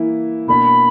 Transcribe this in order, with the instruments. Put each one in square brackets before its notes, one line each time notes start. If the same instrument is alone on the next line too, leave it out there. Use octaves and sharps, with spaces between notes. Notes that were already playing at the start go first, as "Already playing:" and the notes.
Already playing: [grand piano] E3 A#3 E4
[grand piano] B2 A#3 D4 [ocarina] B5